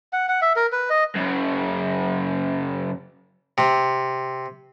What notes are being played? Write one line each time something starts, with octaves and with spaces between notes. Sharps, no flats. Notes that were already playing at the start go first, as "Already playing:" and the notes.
F#5
F#5
E5
A#4
B4
D#5
F#2 C#3
C3